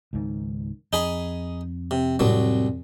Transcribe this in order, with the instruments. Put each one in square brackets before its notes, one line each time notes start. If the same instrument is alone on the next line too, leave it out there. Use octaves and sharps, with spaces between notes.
[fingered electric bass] C#2 G#2 D#3
[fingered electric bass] F2 [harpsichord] D#4 G#4 B5
[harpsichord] C3
[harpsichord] C2 F#3 [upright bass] A2 C4